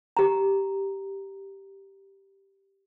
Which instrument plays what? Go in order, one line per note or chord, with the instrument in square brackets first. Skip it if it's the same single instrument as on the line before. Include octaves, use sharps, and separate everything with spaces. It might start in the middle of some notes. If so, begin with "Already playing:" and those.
[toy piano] G4 A#5